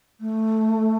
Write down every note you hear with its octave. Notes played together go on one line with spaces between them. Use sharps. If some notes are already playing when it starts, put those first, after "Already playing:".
A3